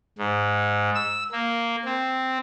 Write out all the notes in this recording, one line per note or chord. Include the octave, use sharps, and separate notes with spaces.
G#2
E6
A#3
C4